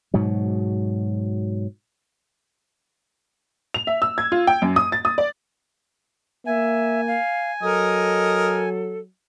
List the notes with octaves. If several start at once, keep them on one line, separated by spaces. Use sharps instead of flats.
G#2 B2 F#3
F7
E5
E6
G#6
F4
G5
F#2
D#6
A6
D#6
D5
A#3 E5 G#5
F5
F#3 A4 A#4 D#5